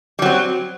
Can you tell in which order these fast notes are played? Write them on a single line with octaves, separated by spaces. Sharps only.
G3 F#3 C4